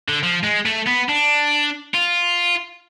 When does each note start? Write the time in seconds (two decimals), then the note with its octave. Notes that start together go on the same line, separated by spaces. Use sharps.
0.09 D3
0.23 F3
0.43 G#3
0.66 A3
0.87 B3
1.09 D4
1.94 F4